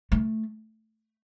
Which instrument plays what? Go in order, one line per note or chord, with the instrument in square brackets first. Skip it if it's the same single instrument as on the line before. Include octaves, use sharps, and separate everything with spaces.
[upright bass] A3